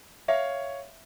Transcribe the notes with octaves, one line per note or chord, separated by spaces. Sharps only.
C#5 E5 F5